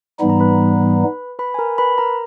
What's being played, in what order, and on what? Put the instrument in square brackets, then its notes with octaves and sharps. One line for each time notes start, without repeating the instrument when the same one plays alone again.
[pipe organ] G#2 E3 G3 B3 D#4 [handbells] B5
[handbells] A#5
B4 B5
B4 B5
G#5
A#4 A#5
B4 B5
A#4 A#5